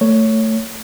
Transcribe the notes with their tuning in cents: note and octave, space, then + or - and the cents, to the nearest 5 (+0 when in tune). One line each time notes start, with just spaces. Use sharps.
A3 +15 C#5 +5